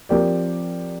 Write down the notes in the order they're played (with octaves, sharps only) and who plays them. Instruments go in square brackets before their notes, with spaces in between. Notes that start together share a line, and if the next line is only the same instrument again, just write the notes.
[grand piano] F3 C4 G4 A#4 D5